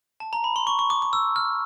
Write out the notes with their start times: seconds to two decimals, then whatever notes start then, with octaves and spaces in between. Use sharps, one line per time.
0.20 A5
0.33 A#5
0.44 B5
0.56 C6
0.67 C#6
0.79 C#6
0.90 D6
1.02 D6
1.13 E6
1.36 F6